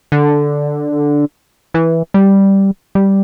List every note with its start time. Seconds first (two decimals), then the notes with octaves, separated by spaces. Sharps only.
0.12 D3
1.74 E3
2.14 G3
2.95 G3